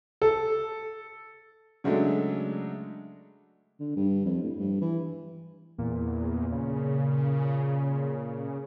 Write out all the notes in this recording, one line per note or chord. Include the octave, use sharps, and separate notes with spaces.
A4
C#3 F#3 G#3 A3 D4 A4
D3
G2
F2
A2
G2
E3
E2 A#2
C#3